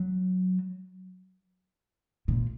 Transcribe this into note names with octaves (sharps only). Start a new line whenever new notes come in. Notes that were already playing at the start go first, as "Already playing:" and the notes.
Already playing: F#3
A#2